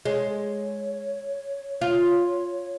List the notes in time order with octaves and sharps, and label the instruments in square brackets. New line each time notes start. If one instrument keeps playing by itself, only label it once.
[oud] G#3 [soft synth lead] C#5
[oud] F4